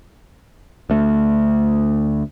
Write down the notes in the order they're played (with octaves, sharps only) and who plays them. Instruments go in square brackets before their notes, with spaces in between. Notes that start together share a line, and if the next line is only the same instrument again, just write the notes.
[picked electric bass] D2 A3